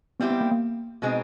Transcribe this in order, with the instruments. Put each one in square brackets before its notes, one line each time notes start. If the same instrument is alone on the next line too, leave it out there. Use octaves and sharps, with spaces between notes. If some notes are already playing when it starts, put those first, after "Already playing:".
[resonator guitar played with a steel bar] G3 C4 E4 G4 [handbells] B3
[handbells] B3
A#3
A#3
[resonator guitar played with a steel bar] B2 G#3 C4 D#4